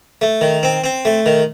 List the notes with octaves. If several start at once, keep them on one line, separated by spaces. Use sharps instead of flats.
A3
D#3
C4
C4
A3
D#3